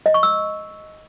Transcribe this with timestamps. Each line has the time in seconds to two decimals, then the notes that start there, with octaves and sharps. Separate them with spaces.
0.06 D#5
0.14 C#6
0.23 E6